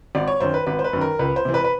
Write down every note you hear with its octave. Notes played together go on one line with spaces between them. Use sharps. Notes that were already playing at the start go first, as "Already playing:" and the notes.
G#1 D5
C#5
F#2 D#3 C5
B4
G#1 B4
C5
B4
F#2 D#3
A#4
C#2 B4
C5
C3 E3
B4
B4